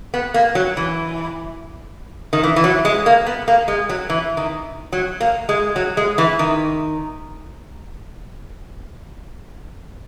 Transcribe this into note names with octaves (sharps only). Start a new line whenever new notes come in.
B3
A#3
F#3
E3
D#3
E3
E3
F#3
G#3
A#3
B3
A#3
G#3
F#3
E3
D#3
F#3
A#3
G#3
F#3
G#3
E3
D#3